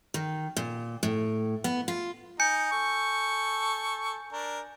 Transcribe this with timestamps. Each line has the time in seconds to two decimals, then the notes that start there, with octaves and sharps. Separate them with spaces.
0.14 D#3
0.57 A#2
1.03 A2
1.64 B3
1.88 F4
2.40 D#4 G#5 G6 C#7
2.72 A4 C#6
4.32 D4 A#4